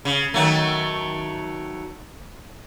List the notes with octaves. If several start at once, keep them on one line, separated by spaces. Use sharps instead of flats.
C#3
D#3 F#3 A3